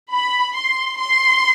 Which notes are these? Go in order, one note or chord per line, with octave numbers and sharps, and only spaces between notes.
B5
C6
C6